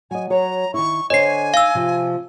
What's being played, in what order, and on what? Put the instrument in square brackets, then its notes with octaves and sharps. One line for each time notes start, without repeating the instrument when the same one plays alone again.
[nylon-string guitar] F#3 D#5 [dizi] G#5
[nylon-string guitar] F#3 C#5 [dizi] A#5
[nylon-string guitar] D#3 E4 [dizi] C#6
[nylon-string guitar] D3 C5 C#5 [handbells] D#5 C7 [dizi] G#5
[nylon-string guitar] D#4 [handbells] F5 E6
[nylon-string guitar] C3 F3 C4